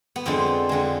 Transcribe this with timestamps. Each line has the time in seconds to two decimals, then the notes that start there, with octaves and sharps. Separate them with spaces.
0.16 B3
0.26 F2 D3 G#3 C4
0.69 F2 D3 G#3